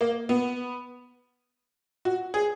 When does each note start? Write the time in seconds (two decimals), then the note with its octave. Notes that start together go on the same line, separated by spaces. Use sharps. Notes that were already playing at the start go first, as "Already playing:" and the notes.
0.01 A#3
0.29 B3
2.05 F#4
2.34 G#4